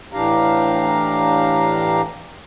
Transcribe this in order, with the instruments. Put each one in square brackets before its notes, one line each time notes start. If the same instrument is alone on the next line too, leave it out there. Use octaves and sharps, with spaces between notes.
[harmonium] A2 E3 D4 G4 F5 A#5